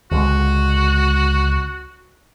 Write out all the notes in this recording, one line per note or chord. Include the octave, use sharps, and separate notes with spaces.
C#2 D3 G#3 F#4